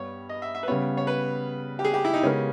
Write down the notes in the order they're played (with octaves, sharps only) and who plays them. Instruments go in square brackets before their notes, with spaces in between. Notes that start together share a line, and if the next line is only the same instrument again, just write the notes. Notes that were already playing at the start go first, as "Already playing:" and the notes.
Already playing: [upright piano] G2 G3 B3 [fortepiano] C#5
[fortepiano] D#5
E5
E5
B4
[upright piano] C#3 G3 B3 [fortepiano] C#5
[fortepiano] C#5
B4
G4
G#4
G4
E4
D#4
[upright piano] C#3 G#3 B3 G4 A#4 [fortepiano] C#4